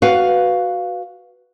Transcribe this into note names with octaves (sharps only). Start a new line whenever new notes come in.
F#4 B4 F5